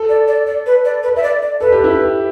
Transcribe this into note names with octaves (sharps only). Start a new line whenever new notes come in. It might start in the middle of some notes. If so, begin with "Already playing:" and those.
Already playing: A4
D5
D5
D5
B4
D5
B4
E5
D5
D5
A4 B4
G4
E4
G4